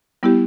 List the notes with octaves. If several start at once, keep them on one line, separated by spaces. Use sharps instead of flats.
G3 B3 E4 G4